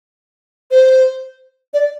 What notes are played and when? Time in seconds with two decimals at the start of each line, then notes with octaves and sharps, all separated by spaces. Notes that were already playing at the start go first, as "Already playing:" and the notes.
0.71 C5
1.74 D5